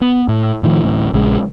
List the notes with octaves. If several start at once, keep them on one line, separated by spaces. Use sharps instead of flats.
B3
A2
A2 D#3 F3
D1 A1 A2
A#1 C#3 G#3